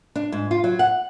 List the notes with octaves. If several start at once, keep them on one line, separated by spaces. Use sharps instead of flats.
D4
G#2
F4
F#3
F#5